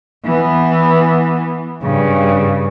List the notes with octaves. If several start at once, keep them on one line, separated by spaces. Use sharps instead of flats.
E3 B3
G2 C#3